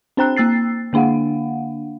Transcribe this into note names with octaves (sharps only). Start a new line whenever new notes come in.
C4 D4 C5 G5 A#5 F#6
A#3 E6 A6 C7
D3 A#3 D4 F5 F#5